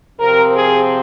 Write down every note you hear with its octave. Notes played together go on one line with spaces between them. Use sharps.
C3 F3 C4 A#4
G#4